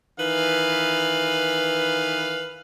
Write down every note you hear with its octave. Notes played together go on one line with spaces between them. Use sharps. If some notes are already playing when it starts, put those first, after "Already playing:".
D#3 E3 B4 F5